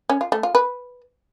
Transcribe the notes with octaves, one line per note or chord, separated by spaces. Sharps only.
C#4
F4
A3
F4
B4